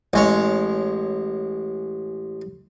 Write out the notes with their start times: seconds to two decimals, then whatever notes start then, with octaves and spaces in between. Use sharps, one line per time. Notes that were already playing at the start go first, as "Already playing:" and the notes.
0.13 A1 G#3 C#5